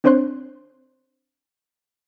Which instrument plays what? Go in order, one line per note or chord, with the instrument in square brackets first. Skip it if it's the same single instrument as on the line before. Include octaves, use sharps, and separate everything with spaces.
[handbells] C4 D4 C5 C#5 C6 F#6